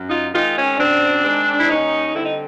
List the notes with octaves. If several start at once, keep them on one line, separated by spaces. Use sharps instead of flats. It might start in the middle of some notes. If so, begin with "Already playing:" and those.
Already playing: F#2
D#4 F4
D#3 G#3 C4 D#4 F4
C#4
F#2 C4 D4
D#3 G#3 C4
E4
D#2 C#4 D#4
D3 G3 C4 E4
D#4